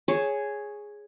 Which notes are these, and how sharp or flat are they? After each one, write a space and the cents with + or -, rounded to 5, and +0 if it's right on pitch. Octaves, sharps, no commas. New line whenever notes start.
G#4 +0 C#5 +0 A5 +0